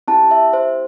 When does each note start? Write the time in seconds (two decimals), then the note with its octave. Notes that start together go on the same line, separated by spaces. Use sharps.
0.08 C4 E4 G4 A5
0.31 E5
0.53 C5